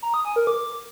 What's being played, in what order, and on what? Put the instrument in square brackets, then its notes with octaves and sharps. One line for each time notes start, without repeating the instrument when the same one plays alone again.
[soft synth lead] A#5
D#6
G#5
A#4
D6